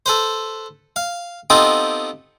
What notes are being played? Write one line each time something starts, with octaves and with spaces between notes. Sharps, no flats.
A4 B4 C5
F5
B3 C4 D#4 F4 G4 A4